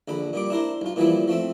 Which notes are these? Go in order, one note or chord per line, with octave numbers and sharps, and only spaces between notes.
A#1 D3 B5
A#2 G3 D6
D4 E4 A#4 C5
B1 F4
A#2 E3 F3 G3 E4
F3 A3 C4 E5